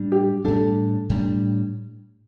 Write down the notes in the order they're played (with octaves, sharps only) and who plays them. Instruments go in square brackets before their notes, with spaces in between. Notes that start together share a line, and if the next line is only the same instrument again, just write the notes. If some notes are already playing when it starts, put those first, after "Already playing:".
Already playing: [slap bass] A2 G3 D4
[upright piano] G4
[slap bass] A2 G3 D4 [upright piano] A4
[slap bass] A2 G3 D4